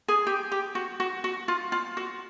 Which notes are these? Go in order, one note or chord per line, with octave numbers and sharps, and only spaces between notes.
G#4
G4
G4
F#4
F#4
F#4
F4
F4
F#4